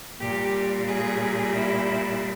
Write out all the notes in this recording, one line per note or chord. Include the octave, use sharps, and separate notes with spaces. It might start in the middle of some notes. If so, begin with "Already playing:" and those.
A#2 G4
G3
G#4
E4